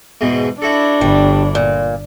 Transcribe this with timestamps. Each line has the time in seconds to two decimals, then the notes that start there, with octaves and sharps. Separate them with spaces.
0.21 E2 G#2 B2
0.62 D4 E4 F#4 A4
1.01 G1 G3
1.55 A#2